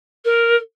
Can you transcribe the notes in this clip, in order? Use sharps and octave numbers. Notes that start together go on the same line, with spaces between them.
A#4